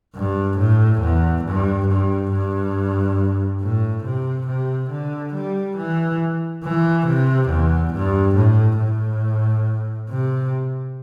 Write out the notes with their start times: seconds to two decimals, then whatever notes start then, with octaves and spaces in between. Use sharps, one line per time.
0.15 G2
0.58 A2
1.01 E2
1.44 G2
1.88 G2
2.31 G2
3.61 A2
4.04 C3
4.47 C3
4.90 D3
5.34 G3
5.77 E3
6.63 E3
7.07 C3
7.50 E2
7.93 G2
8.36 A2
8.79 A2
10.09 C3